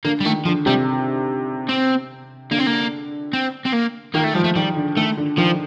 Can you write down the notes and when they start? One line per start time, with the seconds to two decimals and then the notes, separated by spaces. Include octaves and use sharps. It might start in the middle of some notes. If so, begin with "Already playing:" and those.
0.04 D3 A#3
0.20 G3
0.25 D#3 A3
0.45 D3 F3
0.66 C3 G3
1.69 C4
2.51 D3 A#3
2.59 C4
2.66 A#3
3.33 C4
3.66 C4
3.73 A#3
4.14 D#3 A#3
4.25 A3
4.34 F3 G3
4.44 A3
4.56 D#3 G3
4.77 D3
4.97 D#3 A3
5.17 D3
5.38 D#3 F3